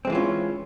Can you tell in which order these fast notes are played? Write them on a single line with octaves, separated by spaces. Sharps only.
C4 G#3 E3 F4 C#4